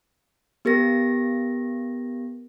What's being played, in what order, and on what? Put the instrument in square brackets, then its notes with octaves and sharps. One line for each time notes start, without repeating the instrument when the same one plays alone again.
[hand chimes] B3 G4 A#4 A#6